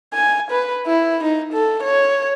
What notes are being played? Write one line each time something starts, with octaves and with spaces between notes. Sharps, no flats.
G#5
B4
E4
D#4
A4
C#5